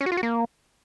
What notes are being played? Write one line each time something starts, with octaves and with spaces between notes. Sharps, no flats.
C#4
F#4
F4
F#4
A#3